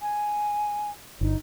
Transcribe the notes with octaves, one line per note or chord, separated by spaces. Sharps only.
G#5
G1 D#4